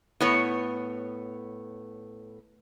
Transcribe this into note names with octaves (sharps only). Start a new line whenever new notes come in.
A2 B3 C#5